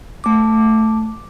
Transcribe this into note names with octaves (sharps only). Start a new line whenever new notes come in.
A3 D6